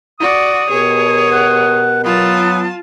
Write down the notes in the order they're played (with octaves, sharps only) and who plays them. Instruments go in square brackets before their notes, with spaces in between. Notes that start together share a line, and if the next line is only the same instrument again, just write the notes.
[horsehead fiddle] F#4 D5 [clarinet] D#6
[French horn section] B2 G4 A#4 [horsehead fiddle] G#4 C#5
[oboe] F#5
[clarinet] F#3 [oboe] B3 [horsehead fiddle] F4 A5